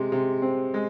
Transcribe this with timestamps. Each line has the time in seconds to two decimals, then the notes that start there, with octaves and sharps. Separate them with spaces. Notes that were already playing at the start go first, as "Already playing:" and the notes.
Already playing: C3 G#3
0.12 C3
0.42 C4
0.74 G#3